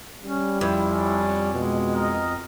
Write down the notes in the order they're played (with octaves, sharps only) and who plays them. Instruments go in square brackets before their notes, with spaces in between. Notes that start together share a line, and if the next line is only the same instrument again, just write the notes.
[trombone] G3 [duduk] C#4
[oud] F2 [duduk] E4
[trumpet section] C#4 D4
[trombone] B2 [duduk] G#3
[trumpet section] A#4 D#5